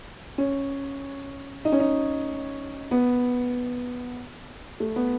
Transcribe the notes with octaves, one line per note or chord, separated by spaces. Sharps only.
C#4
D#4
C#4
D#4
B3
A3
B3